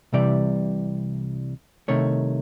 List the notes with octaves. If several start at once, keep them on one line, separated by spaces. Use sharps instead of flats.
C2 C3 E3 G3 D5
C2 C3 D#3 A3 C#5